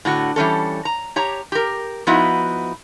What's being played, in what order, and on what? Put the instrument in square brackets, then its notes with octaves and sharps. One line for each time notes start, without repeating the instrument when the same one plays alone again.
[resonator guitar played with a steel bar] A2 D3 F#4
E3 G3 C#4 A4
A#5
G4 C#5 A#5
G4 A#4
F3 B3 D#4 E4 F#4